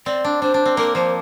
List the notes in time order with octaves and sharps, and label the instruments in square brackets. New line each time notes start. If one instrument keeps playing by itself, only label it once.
[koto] C4 [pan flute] D5
[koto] D4
[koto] D4 [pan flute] C5
[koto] D4
C4
[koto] A#3 [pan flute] A#4
[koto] F3 [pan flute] C5